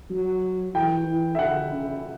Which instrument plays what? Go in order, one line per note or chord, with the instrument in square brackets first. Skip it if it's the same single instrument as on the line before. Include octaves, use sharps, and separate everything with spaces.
[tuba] F#3
[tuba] E3 [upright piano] G5
[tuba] E3
[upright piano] E5
[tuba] D3 [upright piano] F#5
[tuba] C#3